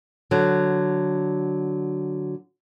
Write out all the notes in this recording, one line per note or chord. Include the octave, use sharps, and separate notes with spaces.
D3 F#3